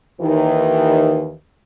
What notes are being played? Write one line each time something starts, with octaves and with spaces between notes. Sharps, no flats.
D#2 D#3 E3